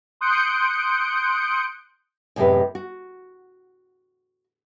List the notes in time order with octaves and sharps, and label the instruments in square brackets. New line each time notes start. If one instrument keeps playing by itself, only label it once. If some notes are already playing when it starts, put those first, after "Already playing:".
[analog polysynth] C6 D#6 F#6 G6 C#7 D7
[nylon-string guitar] F#2 A2 C3 G#3 G4 B4
F#4